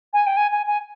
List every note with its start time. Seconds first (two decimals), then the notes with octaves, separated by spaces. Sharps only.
0.13 G#5
0.26 G5
0.37 G#5
0.52 G#5
0.67 G#5